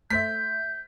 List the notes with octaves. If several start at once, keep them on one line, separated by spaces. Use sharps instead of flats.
A3 C5 E5 G6 B6